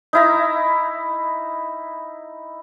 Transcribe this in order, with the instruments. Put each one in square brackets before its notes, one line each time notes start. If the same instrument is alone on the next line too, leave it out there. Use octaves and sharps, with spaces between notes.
[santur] D#4 E4 A#5